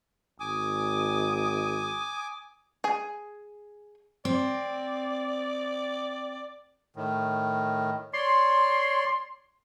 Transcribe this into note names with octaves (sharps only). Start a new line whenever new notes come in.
G#1 G#5 D6 D#6
G#4 G#5
C4 D5
A2 D#3
C#5 D5 C6